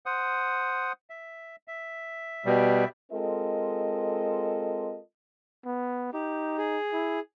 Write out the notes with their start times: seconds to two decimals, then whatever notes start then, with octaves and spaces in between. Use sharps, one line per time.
0.06 C5 F#5 D#6
1.10 E5
1.68 E5
2.46 B2 G3
3.12 G#3 C4 F4 A4 A#4 D#5
5.65 B3
6.13 D#4 G4
6.58 G#4
6.93 E4